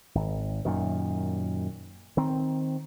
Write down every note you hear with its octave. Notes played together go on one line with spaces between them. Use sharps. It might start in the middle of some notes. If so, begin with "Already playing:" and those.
G#1
F#2 A#2 D#3
D#3 C4